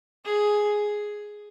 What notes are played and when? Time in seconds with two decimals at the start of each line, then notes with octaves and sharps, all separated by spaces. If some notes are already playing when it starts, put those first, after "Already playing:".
0.25 G#4